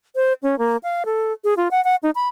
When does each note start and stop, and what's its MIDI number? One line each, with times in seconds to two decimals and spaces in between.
0.16 0.33 72
0.43 0.58 61
0.59 0.77 58
0.83 1.03 77
1.05 1.32 69
1.44 1.54 68
1.57 1.68 65
1.71 1.83 78
1.84 1.96 78
2.03 2.10 63
2.15 2.28 83